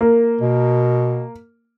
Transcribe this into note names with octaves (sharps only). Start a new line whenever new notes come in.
A#3
B2